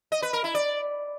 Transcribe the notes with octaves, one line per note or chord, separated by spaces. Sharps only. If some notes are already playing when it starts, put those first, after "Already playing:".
D#5
B4
A#4
E4
D5